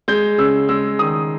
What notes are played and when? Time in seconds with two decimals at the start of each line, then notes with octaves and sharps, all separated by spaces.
0.08 G#3 G6
0.38 C#3 E6
0.69 G#3 E6
0.99 D#3 D#6